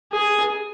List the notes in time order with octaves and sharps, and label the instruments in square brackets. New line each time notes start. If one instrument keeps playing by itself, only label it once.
[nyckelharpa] G#4